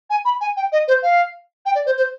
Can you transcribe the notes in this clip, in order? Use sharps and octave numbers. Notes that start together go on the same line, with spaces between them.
G#5
B5
G#5
G5
D#5
C5
F5
G5
D5
C5
C5